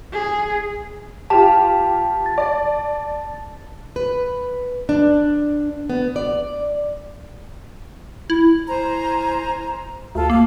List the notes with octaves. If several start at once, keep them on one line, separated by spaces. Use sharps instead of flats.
G#4
F4 G4 A5
A6
D5
B4
D4
B3
D5
E4
C5 G#5 A#5
D2 F4 A4
A#3 F5